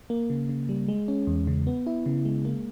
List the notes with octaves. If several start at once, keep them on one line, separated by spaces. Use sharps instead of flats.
A#3
C#3
C#3
G3
G#3
C#4
E2
C#3
B3
E4
C#3
G#3
A#3